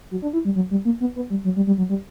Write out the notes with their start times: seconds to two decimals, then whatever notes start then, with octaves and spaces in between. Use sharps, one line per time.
0.11 F#3
0.22 D4
0.33 E4
0.45 G3
0.56 F#3
0.71 G3
0.85 A#3
1.00 B3
1.16 B3
1.30 G3
1.44 F#3
1.56 G3
1.67 G3
1.78 F#3
1.89 G3